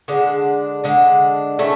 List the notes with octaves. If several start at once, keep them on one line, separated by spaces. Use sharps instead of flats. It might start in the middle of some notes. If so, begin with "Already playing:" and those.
D3 G#3 D4
D3 G#3 D4
A3 C#4 E4 A4